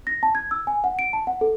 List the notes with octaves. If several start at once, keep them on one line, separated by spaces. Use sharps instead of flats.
A#6
A5
G#6
E6
G#5
F#5
D7
A5
F#5
A4